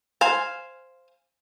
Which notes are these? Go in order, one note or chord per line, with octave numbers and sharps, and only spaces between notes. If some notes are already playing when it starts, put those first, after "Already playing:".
C5 F5 G#5